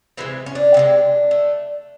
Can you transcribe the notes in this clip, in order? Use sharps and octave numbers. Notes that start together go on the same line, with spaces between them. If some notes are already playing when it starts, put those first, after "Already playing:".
C3 E3 G#3 C4
C#4
D4
C3 E3 G#3
A3